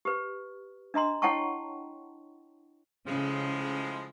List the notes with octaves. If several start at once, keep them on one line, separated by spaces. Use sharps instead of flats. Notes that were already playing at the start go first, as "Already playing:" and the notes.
G4 B4
D4 D#5 A#5 C6
E4 C#5 F#5 G5 A5 C#6
A2 C#3 F3 G#3